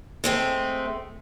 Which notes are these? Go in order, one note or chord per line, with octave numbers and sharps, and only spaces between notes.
G#3 A3 C4